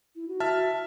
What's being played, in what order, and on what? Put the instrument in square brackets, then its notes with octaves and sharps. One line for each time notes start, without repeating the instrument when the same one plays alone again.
[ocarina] E4
F#4
[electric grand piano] E5 A5 F6